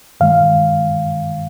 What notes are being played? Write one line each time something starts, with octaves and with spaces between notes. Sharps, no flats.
G2 D#3 G#3 F5